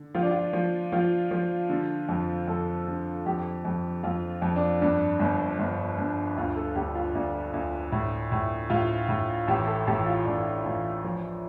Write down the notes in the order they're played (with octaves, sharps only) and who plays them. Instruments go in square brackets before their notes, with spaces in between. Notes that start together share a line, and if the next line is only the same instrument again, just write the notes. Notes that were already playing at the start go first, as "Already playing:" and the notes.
Already playing: [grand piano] D3
F3 F4
D4
F4
F3
F3 F4
F3
D3
F2
F2 A4
D3
F2 G4
F2
F2 F4
F2
D4
G2 D4
G1
G1
G2
D2 F4
A4
D2 G4
F4
D2 D4
D2
A2
A2
A2 F4
A2
A1 G4
A4
A1 G4
F4
A1 D4
A1
F3